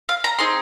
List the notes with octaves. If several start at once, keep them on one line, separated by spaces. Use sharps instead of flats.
F5
A#5
C4 D#4 G#4 C6